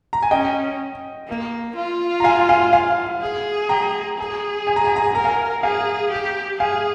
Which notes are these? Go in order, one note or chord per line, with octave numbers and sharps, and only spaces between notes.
A#5
G#5
C#4 D#5 G5
A#3
F4
A#5
F5 G#5
F5 G#5
F5 G#5
G#4
G5 A#5
G#4
G#5
A#5
G#5
A#5
G#5
A#4 A#5
F5 G#5
G#4 F5 G#5
G4
G#4 F5 G#5